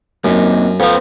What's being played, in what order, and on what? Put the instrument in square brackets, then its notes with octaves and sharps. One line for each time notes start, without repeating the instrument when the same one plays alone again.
[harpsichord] F#2 [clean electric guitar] A#3 C4 D#4
[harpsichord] F2 F3 [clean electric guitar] B3 C5